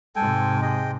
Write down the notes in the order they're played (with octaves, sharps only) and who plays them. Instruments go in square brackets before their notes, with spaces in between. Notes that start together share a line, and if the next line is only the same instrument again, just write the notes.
[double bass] G#2 C3 [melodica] A4 G5 G#5
[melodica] G#4 D#5 G5